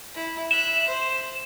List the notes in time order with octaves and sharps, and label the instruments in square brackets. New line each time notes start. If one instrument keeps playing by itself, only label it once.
[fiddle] E4
[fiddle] E5 F#6 [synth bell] E7
[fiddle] C5